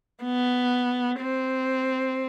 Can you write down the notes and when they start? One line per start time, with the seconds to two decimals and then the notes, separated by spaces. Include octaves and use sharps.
0.23 B3
1.19 C4